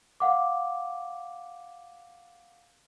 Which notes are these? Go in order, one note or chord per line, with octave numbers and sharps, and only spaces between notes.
F5 F#5 D6